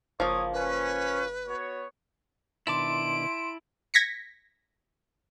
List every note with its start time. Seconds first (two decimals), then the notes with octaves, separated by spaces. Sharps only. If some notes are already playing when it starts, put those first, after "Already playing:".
0.20 F#1 F3 A#3 C#5 D#6
0.53 C#4 B4
1.48 B3 F#4 C#5
2.67 B2 D#3 D4 E4 A5 C6 D6 D7
3.94 G#6 A#6 B6 C#7